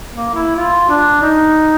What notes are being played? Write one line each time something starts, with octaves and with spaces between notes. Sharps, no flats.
A#3
E4
F4
D4
D#4